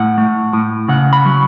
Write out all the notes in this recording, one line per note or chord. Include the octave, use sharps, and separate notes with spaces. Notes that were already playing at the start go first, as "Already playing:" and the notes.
Already playing: A2 F#5
A3
A2
C#3 F#5
B5
F#3